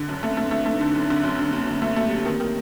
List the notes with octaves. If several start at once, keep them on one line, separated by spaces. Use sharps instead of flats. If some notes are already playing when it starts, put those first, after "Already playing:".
Already playing: D3
F#2
A3 C4
A3
A3 D4
A3
D#4
D3
D4
F#2
D3 C4
F#2
A3
D3
A#3
F#2
D3 A3
A3 A#3
A3
F#2 G4
D#3
D#3